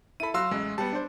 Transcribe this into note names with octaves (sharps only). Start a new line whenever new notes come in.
E4 A4 B5 D#7
F#3 F5 C6 E6
A1 G#3
G3 B3 A5
D4 C5